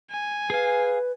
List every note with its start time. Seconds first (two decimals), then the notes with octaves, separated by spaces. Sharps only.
0.10 G#5
0.50 G#4 B4 F5